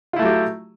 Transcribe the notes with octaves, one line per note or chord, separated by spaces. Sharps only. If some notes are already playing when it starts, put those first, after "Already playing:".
F#3 A3 E4 F4 G4